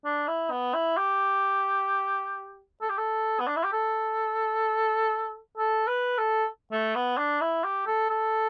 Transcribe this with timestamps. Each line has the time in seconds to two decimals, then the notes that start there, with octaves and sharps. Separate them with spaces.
0.05 D4
0.28 E4
0.51 B3
0.74 E4
0.98 G4
2.82 A4
2.89 G4
2.98 A4
3.40 B3
3.48 D4
3.56 E4
3.64 G4
3.73 A4
5.57 A4
5.87 B4
6.19 A4
6.72 A3
6.95 B3
7.18 D4
7.41 E4
7.64 G4
7.87 A4
8.10 A4